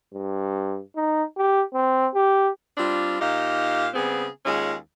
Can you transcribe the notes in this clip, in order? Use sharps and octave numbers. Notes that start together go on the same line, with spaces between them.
G2
D#4
G4
C4
G4
G3 C4 D4 F4
A#2 D#4 G4 F5
C#3 G3 B3 C4 G#4
D#2 G#3 C#4 F4 G#4